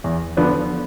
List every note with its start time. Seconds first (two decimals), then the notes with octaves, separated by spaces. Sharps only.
0.04 E2
0.37 D3 F3 B3 D4